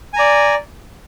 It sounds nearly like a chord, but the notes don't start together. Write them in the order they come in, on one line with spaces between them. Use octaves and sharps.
G#5 A#5 D5